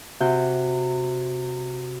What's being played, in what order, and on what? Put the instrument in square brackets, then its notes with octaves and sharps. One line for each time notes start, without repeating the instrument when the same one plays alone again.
[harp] C3 F#4 G6